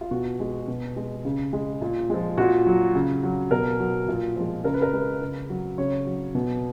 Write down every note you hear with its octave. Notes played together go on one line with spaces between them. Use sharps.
F4
B2 F#4
G#3
B2
G#3
C#3
G#3
A#2
F3 G#3
A#2 F#4
F#3
C#3
F#3
B2 A#4
F#3
A#2
F3 G#3
C#3 A#4
B4
A#4
G#3
C#3
F#3
C#3 C#5
F#3
B2